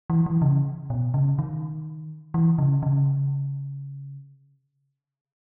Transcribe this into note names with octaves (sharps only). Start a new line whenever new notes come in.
E3
E3
C#3
B2
C#3
D#3
E3
C#3
C#3